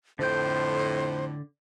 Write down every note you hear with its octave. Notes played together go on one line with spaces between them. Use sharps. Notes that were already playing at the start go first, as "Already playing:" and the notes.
F2 A2 D3 C5 G5